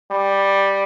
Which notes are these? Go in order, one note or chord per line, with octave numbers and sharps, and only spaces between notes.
G3